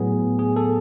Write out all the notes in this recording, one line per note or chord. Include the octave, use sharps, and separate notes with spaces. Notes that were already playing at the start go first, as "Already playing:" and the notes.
Already playing: A2 F#3 B3 G#4
G#4
A4